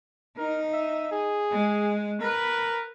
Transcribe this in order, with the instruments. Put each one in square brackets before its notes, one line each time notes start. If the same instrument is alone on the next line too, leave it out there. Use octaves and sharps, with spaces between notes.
[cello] D#4 [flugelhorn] A#4
[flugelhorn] E5
G#4
[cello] G#3
[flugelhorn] A#4 [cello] B4